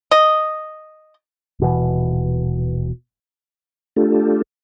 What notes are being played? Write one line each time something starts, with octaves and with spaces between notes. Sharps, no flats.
D#5
D#1 B2 E3
A3 D4 F4 G4 A4